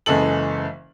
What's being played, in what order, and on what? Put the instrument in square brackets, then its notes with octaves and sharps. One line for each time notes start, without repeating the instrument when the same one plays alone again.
[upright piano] F#1 C#3 E3 G#3 A4 F#7